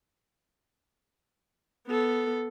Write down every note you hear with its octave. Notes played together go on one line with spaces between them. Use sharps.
B3 A4